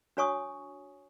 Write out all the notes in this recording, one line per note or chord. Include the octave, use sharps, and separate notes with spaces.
D4 F#4 C#5 G#5 C#6 D#6